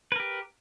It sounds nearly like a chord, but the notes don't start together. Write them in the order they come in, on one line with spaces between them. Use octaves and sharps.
B4 A#4 G4